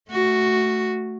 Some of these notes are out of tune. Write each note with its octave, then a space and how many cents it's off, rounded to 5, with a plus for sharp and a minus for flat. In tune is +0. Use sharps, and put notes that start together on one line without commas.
A3 +0 F#4 +0